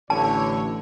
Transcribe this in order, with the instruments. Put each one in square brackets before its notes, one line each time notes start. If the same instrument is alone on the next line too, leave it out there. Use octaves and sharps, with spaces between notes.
[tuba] A1 [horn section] D3 E4 C#5 [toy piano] A5